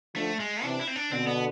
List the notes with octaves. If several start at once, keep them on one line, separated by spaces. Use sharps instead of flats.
D3 F3 A3
G#3
C3 E3 D4
E4
C4
D4
B2 D3 C4
B3